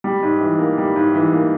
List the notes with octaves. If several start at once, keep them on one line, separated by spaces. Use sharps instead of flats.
G3
G#2
E3
A#3
G3
G#2
E3
A#3